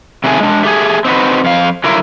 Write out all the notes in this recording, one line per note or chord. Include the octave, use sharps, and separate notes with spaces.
C3 D#3 F#3 A3 G#4 G#5
G#3 D4
A3 G4 G#4
C4 D#4 F#4 B4
F2 F5
D3 F#3 E4 F4 A#4